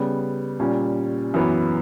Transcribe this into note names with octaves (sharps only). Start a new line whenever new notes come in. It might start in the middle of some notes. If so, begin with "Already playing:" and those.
Already playing: C#3 G3 B3
A#2 G3 C#4
F#2 E3 B3